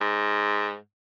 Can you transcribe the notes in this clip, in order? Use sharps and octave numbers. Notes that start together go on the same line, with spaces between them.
G#2